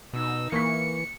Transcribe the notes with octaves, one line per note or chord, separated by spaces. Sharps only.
B2 D#4 E6
E3 A#3 C#6 B6 C#7